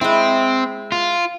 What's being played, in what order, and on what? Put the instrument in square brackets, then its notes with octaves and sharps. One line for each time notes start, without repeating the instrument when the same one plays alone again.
[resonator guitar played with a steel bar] G#3 E4 [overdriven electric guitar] C4
[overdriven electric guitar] F4